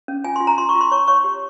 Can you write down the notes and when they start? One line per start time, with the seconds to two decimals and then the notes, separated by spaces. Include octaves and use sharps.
0.08 C#4
0.24 F4 G#5
0.36 F4 C6
0.47 A#5
0.58 F4 C6
0.69 C#6
0.75 F4
0.81 C6
0.91 C#5 C#6
1.07 C#5 C#6
1.24 G4